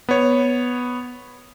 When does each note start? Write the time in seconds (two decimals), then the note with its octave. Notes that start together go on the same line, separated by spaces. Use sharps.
0.09 B3 C#5